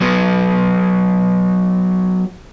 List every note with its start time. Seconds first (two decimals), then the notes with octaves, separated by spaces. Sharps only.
0.01 F#3 B3